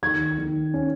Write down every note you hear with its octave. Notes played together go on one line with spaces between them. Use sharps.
D#3 G#6
D#3
C#4